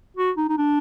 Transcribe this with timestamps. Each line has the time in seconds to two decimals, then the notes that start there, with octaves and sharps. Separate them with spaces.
0.17 F#4
0.37 D#4
0.49 D#4
0.58 D4